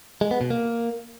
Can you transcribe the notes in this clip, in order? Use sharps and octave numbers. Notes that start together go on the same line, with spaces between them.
G#3
B3
B2
A#3